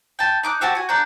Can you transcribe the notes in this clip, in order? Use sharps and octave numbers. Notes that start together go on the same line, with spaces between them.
G5 A5
D#4 D6 F#6
C4 F#4 G4 A5
F#4 G#5
D4 F#5 A#5 G6